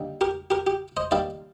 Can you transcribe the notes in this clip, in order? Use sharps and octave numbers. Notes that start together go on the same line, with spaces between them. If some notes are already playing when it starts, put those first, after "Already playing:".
Already playing: D3 G3 A#3 D#4
G4 A#4
G4 A#4
G4
C5 D#5
D#3 G3 A#3 D5 F5